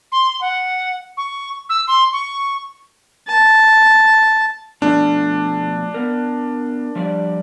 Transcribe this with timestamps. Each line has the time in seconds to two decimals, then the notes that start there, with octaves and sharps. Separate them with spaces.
0.12 C6
0.41 F#5
1.17 C#6
1.69 E6
1.88 C6
2.13 C#6
3.27 A5
4.82 B2 F3 A3 D4
5.94 B3 A#4
6.96 F3 G3 D5